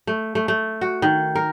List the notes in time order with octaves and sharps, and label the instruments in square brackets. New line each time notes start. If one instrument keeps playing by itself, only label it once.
[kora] A3
A3
A3
F#4
D#3
A#4